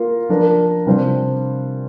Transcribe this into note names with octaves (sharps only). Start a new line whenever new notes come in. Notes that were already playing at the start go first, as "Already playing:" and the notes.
Already playing: A#3 F4 A#4
F3 D4 A#4
C3 G3 D4 F4 C5